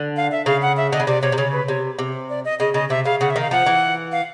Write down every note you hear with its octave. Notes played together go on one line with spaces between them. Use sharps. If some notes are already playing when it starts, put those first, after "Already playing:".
Already playing: D3
F5
E5
C#3 F5
F#5
E5
D3 D#5
C#3
C3 D5
C3 C#5
C3
C#3 C#5
B4
C3 C#5
C3
D5
D#5
C#3 D#5
C#3 D#5
C3 E5
C#3 F5
C#3 F#5
E5
D#3
F5
F3 F#5
E3
F5